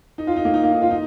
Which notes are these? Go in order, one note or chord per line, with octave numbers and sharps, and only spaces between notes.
D#4
F4
D#4
A#3
D#4
A#3
D#4
F4
D#4